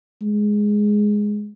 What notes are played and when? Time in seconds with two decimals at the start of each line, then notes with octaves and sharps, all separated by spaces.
0.22 G#3